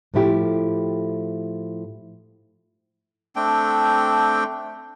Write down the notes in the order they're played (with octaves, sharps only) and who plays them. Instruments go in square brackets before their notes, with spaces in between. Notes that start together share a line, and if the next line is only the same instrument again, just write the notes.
[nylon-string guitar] A2 F3 A3 E4 G4
[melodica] A3 C4 D4 G5